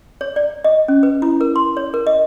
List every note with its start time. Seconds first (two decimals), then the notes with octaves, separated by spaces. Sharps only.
0.21 C#5
0.36 D5
0.64 D#5
0.88 C#4
1.03 B4
1.22 E4
1.41 A#4
1.56 C6
1.77 C#5
1.94 A#4
2.07 D#5